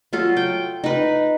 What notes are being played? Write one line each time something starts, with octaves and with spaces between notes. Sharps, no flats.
F#3 F4 A4
G5
D#4 B4